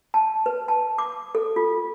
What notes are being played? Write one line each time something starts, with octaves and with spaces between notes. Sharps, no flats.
A5
B4
A5
D6
A4
F4